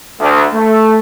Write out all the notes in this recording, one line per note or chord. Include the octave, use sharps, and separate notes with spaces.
D2
A3